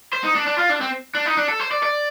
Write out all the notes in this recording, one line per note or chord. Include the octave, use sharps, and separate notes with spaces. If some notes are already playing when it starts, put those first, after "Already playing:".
C5
D#4
D4
D4
F4
D4
C4
D4
D#4
D4
A4
C5
D5
D5